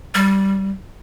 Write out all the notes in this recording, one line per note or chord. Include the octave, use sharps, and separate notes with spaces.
G3